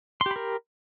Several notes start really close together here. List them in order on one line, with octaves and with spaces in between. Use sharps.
C6 G4 B5 A#4